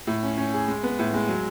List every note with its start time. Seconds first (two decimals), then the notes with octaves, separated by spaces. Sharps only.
0.07 A2
0.23 C#4
0.37 C#4
0.53 G#4
0.68 G#3
0.83 B3
0.99 A2
1.13 G#3
1.29 F#3